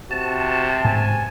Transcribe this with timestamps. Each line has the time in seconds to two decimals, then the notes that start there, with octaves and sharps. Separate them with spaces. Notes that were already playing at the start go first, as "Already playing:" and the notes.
0.11 C3 F#4 A5
0.84 G#2 B3 G#5